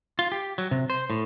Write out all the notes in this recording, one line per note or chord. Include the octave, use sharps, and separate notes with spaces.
F4
G4
F#3
C3
C5
A2